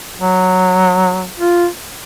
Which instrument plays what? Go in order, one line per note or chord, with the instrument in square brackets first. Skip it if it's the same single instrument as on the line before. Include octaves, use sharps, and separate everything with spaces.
[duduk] F#3
F4